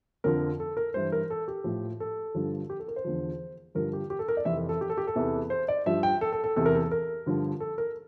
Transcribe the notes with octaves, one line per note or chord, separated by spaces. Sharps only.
F2 D3 F3 A#4
A4
A#4
G2 E3 C5
A#4
A4
G4
A2 F3
A4
G2 D3 F3
G4
A4
A#4
C5
E2 D3 F3
G2 D3 F3 A#4
G4
G4
A4
A#4
D5
F2 C3 E3 E5
A4
A4
G4
A4
G4
A4
E2 C3 E3
C5
D5
G2 F3 E5
G5
A4
A4
A4
E2 C3 E3 A4
A#4
A4
A#4
G2 D3 F3
A4
A#4